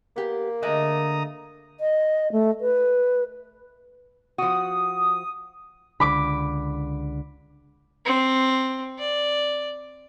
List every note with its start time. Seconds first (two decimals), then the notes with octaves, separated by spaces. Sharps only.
0.16 A#3 B3 G4
0.62 D3 G#3 A3 D#5 A#5 D#6
1.79 D#5
2.32 A3
2.60 B4
4.38 F3 F#4 D#6
6.00 C#2 D3 B5 D6
8.06 C4
8.99 D5